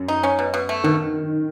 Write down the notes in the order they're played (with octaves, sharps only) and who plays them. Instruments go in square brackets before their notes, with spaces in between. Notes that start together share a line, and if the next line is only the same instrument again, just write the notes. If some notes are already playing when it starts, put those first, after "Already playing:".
Already playing: [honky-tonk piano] F#2
[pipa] D#4
C#4
B2
B2
A3
[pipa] B2 [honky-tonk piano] D#3